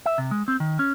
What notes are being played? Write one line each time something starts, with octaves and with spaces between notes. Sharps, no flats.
E5
C3
G#3
C4
D#3
C#4